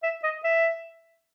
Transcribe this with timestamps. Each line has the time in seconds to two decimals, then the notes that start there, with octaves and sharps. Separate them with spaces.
0.03 E5
0.23 D#5
0.44 E5